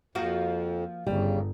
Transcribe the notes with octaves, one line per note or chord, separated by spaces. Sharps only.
F2 F3 A#3 F#4
G1 C#3 G3